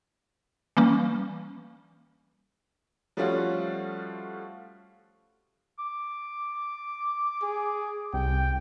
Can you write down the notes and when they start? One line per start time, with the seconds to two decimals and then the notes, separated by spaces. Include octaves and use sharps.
0.77 E3 G3 A#3 C#4
3.17 F3 G3 A3 C#4 F4 F#4
5.79 D6
7.43 G#4
8.14 C2 G5